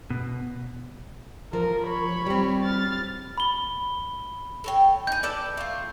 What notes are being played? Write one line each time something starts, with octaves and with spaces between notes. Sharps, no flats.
B2
F3 A#4
C#5 B5
G3 C4
F6 A6
B5 G7
A4 C#5 G5
D#4 G#4 G6
A4 B4 D5
A3 F4